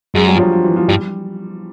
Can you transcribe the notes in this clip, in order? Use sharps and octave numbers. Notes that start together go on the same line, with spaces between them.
F#2 G#3
G3
F3
F#3
F3
E3
F3
G2 G3